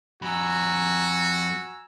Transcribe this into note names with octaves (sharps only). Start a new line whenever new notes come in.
F2 F#4 G#5 A#5 B5 E6